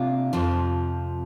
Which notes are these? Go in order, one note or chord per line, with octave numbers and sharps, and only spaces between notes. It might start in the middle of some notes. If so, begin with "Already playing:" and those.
Already playing: C3 A#3 D4 F4
F2 C3 F3